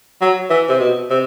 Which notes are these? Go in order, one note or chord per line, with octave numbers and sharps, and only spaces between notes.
F#3
E3
C3
B2
C3